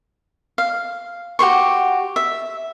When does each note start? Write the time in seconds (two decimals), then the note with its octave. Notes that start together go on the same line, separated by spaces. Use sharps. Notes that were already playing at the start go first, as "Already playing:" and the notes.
0.58 F5
1.39 F#4 G4 C5 C#6
2.16 E5